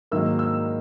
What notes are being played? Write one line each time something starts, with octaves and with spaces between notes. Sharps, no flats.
G#2 D#3 F#3 A#3 E6
E6